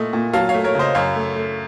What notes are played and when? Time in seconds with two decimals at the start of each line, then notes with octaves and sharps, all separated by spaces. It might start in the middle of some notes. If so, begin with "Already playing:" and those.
Already playing: A#2 A3 D#5
0.13 A#2
0.33 F#3 F5 A5
0.49 C#5 F5
0.54 A3
0.64 A#4 C#5
0.75 C#3 C5 D#5
0.95 F#2 C#5 F5
1.15 A3
1.36 A3